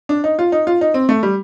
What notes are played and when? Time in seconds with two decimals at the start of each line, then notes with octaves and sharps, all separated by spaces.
0.09 D4
0.24 D#4
0.39 F4
0.52 D#4
0.67 F4
0.81 D#4
0.94 C4
1.09 A3
1.23 G3